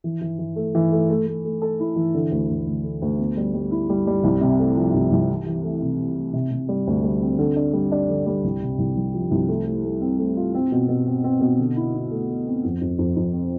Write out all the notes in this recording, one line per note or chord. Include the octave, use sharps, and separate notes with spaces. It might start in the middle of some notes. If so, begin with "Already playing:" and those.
E3
E3
E3
A3
E3
A3
A3
A3
A3
A4
E4
E3
D3
D2
D2
D2
A3
D2
B3
G3
G3
E4
G3
G3
C2
C3
A3
F3
C2
C2
E3
E3
A3
C3
C3
A3
C3
C3
G3
D2
G3
C4
D3
D4
G3
D4
D3
G3
C2
C3
C2
C2
F3
C2
A3
A3
A3
C4
A3
F4
C4
B2
B2
C4
C4
B2
D3
E4
E4
A3
A3
C4
F2
F2
F2
F2
C4